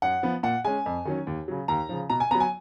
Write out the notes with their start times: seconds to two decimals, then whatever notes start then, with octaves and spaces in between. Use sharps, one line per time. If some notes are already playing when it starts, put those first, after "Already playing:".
0.02 F#2 F#5
0.23 F3 B3
0.43 A#2 F#5
0.65 G#3 C#4 G#5
0.86 F2
1.05 D#3 F#3 C#4
1.27 D#2
1.48 C#3 F#3
1.68 D#2 A#5
1.89 C#3 F3
2.10 B2 A#5
2.20 G#5
2.31 B3 A#5
2.35 F#3
2.40 G#5